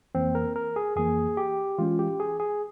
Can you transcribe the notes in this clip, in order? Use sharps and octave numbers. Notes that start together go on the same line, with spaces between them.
F2 E3 A#3 C4
A#4
A#4
G#4
F2 E3 A#3 G#4
G4
E3 G#3 C#4 F4
G4
G#4
G#4